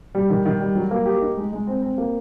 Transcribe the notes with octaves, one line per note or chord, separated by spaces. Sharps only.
G3
D#3
D#3
G3
F#3
A#3
G4
D#4
G#3
G#3
C4
C4
A#3